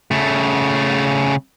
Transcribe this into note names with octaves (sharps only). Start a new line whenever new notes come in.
C#3 A3